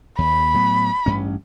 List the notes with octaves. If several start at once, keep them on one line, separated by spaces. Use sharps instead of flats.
D#2 B5
A2 F#3 B3
A1 G2 C#4